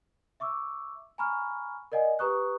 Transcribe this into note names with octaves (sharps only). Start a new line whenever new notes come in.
E5 C#6 D6 E6
G#5 A#5 B5 C#6 F6
A#4 D5 D#5 F#5 G#5
G4 B4 A#5 C#6 D#6 F#6